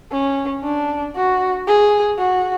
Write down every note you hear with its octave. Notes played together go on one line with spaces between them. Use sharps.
C#4
D4
F#4
G#4
F#4